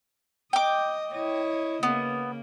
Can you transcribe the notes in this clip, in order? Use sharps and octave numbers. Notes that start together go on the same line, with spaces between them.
D#5 G5 D6
E4 C#5 D#5
C#3 A#3 B3